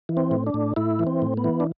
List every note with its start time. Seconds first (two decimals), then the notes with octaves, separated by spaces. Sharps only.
0.09 E3
0.17 C4
0.31 A2
0.47 D4
0.54 A2
0.76 A2 E4
0.99 E3
1.07 C4
1.22 A2
1.37 B3
1.44 E3
1.60 D4